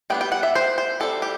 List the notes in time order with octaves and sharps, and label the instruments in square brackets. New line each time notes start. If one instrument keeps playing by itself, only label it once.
[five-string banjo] G3 B3 D4 G5
G5
F#5
E5
C5
C5
G3 C4 A4
G4